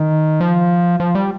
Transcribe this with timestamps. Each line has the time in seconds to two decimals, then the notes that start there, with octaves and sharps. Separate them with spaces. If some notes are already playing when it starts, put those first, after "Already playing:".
Already playing: D#3
0.41 F3
1.00 F3
1.15 G3